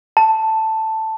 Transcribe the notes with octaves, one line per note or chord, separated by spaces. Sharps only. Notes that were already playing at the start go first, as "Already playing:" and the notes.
A5